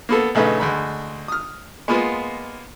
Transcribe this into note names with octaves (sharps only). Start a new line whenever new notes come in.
A#3 B3 A4
A#1 C#3 A3 D#4 B4
D2 G#3 B5
D#6 F6
G#3 A#3 B3 F4